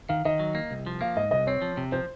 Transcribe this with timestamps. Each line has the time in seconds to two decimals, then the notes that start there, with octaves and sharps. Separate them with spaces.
0.09 D#3 F5
0.25 D#3 D#5
0.39 F#3
0.55 A#3
0.71 C2
0.86 F3
1.01 A#3 F5
1.16 G#2 D#5
1.31 C2 D#5
1.47 C4 C#5
1.62 F3
1.77 C3
1.92 F3 C5